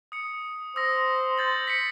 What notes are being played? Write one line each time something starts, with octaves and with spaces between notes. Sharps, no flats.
D#6 C#7
C5 D#6 E6 A#6
G6 A6 F#7
B6 C#7